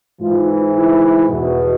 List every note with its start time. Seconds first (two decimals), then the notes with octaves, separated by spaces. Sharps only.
0.20 G#2 E3 F4
0.74 E4
1.28 E2 B2